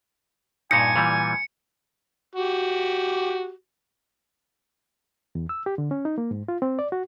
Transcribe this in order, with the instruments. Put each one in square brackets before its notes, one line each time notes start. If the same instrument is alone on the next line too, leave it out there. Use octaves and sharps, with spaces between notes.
[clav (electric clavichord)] G2 A#2 D#4 [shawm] G#5 [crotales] C#7
[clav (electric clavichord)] A#2 E3 G3
[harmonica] F#4 G4
[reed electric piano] E2
E6
G4
D3
C#4
D#4
A#3
G#2
F4
C4
D5
F#4